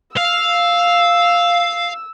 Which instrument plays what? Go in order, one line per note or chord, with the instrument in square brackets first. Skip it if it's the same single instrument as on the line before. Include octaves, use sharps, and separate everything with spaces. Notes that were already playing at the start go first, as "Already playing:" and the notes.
[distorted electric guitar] F5 [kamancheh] E6